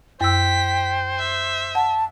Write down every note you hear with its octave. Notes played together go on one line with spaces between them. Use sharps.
F#2 C5 G5 E6 B6
E5
F#5 A5